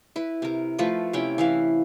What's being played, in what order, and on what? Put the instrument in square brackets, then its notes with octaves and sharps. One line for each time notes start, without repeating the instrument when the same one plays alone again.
[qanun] E4 B4
C3 A#4
F3 A3 F4 B4
C3 C#4 E4 G5
E3 E4 F5